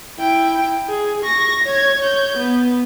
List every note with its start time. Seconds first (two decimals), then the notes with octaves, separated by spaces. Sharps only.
0.20 E4 G5
0.89 G#4
1.23 C#6 A#6
1.64 C#5 G#6
1.99 C#5 G6
2.38 B3